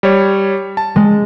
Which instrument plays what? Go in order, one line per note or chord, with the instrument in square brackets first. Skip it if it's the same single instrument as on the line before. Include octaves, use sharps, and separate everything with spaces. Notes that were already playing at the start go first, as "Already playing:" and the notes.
[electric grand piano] G3 C#5
A5
[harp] G#3